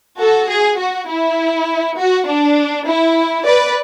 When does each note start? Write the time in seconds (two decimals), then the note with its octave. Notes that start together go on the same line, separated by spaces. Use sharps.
0.19 F#4 A4
0.48 G#4
0.79 F#4
1.08 E4
1.98 F#4
2.27 D4
2.87 E4
3.46 B4 D5